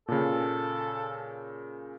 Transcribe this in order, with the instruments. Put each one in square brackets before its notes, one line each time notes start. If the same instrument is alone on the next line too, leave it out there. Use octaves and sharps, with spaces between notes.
[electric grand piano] A#2 C#3 [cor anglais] A4